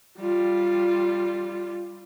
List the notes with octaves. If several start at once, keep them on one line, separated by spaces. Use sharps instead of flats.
G3 F4